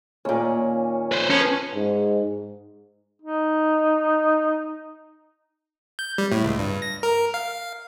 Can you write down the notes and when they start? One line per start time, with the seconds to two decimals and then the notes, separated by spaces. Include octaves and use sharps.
0.25 D#2 A#2 C#4
1.12 B4 C5
1.30 F3 C#4
1.75 G#2
3.22 D#4
5.99 G6
6.18 G3
6.32 A2
6.44 C#2
6.59 G2
6.82 A#6
7.03 A#4
7.34 F5